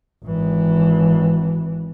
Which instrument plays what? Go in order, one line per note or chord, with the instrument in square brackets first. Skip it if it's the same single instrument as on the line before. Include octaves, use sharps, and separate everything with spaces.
[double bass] G#1 E3